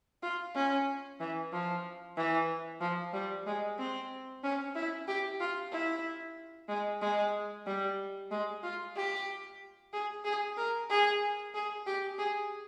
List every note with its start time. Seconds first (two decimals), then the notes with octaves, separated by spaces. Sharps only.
0.23 F4
0.55 C#4
1.20 E3
1.53 F3
2.17 E3
2.81 F3
3.13 G3
3.47 G#3
3.78 C4
4.44 C#4
4.75 E4
5.08 G4
5.40 F4
5.72 E4
6.69 G#3
7.01 G#3
7.66 G3
8.31 G#3
8.63 F4
8.96 G4
9.93 G#4
10.25 G#4
10.57 A#4
10.90 G#4
11.54 G#4
11.87 G4
12.18 G#4